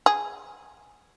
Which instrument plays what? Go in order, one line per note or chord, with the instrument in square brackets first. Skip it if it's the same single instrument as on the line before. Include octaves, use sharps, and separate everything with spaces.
[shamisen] G#4